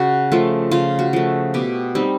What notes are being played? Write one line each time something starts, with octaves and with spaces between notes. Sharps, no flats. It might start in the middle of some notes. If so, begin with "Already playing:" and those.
Already playing: C#3 F#4
F3 A3 F4
C#3 F4
F#4
F3 A3
B2 G4
G3 C4 D#4